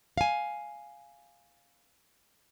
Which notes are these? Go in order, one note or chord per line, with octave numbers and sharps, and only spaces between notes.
F5 G#5